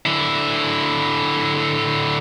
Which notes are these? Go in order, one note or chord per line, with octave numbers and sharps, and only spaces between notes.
D3 E4